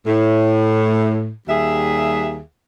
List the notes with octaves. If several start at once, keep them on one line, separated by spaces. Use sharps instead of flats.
A2
D#2 G3 G#4 E5